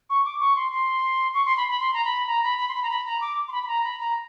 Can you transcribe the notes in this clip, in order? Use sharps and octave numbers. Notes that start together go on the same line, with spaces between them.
C#6
D6
C#6
C6
C6
C#6
C6
B5
B5
C6
A#5
B5
A#5
B5
B5
C6
B5
A#5
B5
A#5
D6
C6
B5
B5
A#5
B5
A#5